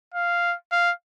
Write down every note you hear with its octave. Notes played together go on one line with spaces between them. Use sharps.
F5
F5